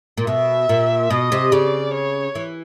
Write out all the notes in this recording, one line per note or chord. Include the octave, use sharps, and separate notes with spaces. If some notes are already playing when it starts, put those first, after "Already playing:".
A#2
B2 E5
A#2
B2 D#5
C3
C#3 D5
C#5
E3